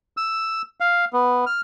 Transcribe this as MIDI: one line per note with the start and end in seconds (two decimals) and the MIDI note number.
0.17 0.62 88
0.80 1.05 77
1.13 1.45 59
1.46 1.61 89